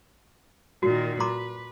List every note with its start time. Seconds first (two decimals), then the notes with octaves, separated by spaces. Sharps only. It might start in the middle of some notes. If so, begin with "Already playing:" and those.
0.83 A#2 D#3 F#4
1.20 B4 A#5 C6 D6